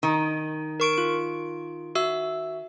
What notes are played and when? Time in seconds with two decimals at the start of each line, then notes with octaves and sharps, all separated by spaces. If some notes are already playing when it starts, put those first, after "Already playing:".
0.03 D#3
0.80 A#4 C#6 D7
0.93 F4 D7
1.95 F#4 E5 E6